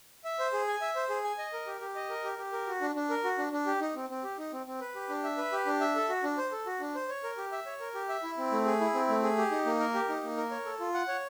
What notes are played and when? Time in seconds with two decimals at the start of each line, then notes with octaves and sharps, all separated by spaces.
0.25 E5
0.39 C5
0.53 G#4
0.67 G#5
0.82 E5
0.96 C5
1.10 G#4
1.24 G#5
1.38 D#5
1.53 A#4
1.67 G4
1.81 G4
1.95 D#5
2.10 A#4
2.24 G4
2.38 G4
2.52 A#4
2.67 F#4
2.81 D4
2.95 D4
3.10 A#4
3.24 F#4
3.38 D4
3.53 D4
3.66 G4
3.81 D#4
3.95 C4
4.10 C4
4.24 G4
4.38 D#4
4.53 C4
4.66 C4
4.81 B4
4.95 G4
5.09 D4
5.24 E5
5.38 B4
5.52 G4
5.66 D4
5.81 E5
5.95 A4
6.09 F#4
6.23 D4
6.38 C5
6.52 A4
6.66 F#4
6.80 D4
6.95 C5
7.09 C#5
7.24 A#4
7.38 G4
7.52 E5
7.66 C#5
7.80 A#4
7.95 G4
8.09 E5
8.23 E4
8.38 C4
8.52 A3
8.66 G#4
8.81 E4
8.94 C4
9.09 A3
9.23 G#4
9.38 G4
9.51 D#4
9.66 A#3
9.80 A#4
9.94 G4
10.09 D#4
10.23 A#3
10.37 A#4
10.51 C#5
10.66 A4
10.80 F4
10.94 F#5
11.08 C#5